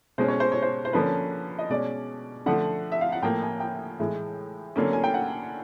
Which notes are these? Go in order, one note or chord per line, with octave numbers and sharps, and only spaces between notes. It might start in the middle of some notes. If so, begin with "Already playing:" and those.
B2 G#3 C#4 C5
C#5
C5
C#5
C5
C5
D3 F3 A#3 C#4 B4
D#5
B2 G#3 C#4 D5
D3 F3 A3 F#5
E5
F5
F#5
A2 F3 A#3 G5
G#5
G5
A2 E3 G#3
D3 F#3 A#3 C#4
G#5
G5
F#5